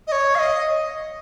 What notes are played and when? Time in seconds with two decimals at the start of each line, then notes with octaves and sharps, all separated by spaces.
0.07 D#5
0.12 C#5
0.35 F5
0.39 D#5